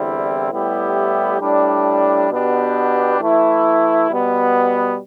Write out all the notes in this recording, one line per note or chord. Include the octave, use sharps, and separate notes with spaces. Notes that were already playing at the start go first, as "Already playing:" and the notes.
Already playing: E2 D3 G3 C4 E4
A2 G3 B3 E4 G4
A2 G3 D4
B2 B3 D4 G4
E3 A3 E4
B2 G3 B3